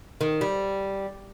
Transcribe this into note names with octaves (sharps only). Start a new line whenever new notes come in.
D#3
G3